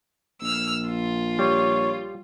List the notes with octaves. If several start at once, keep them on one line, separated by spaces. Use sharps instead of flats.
A#1 E6 F6
F4
G3 C#5